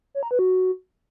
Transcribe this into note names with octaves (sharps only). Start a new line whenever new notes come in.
C#5
A#5
B4
F#4